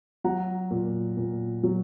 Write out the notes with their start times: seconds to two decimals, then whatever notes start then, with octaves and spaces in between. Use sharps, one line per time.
0.24 F#3 F#5 A#5
0.71 A#2
1.17 A#2
1.63 F#3